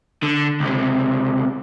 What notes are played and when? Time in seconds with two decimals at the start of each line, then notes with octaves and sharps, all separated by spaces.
0.23 D3
0.60 C#2 C3